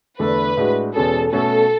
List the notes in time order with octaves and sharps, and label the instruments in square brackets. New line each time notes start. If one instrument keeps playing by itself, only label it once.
[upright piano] E2 D3 A3 D4 A4 [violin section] B4
[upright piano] A2 G#3 D4 F#4
[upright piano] E2 B2 G#3 C#4 G#4 [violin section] A4
[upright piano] B2 A3 C#4 F#4 [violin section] A4